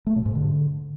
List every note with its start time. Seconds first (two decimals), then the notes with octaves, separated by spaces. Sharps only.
0.07 A3
0.16 B2
0.26 G#2
0.35 D3